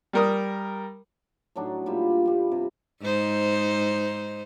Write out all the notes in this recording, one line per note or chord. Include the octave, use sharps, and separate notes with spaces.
G3 A#4 D#6
A2 F#3 D4 D#4
A#2 G3 F4 E5
B5
G2 G3
C3
G#2 D#4 C5